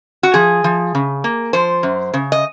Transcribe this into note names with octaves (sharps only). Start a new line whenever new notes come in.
F#4
F3 G#4
F3
C#3
A#3
F3 C5
F#2
C#3
D#5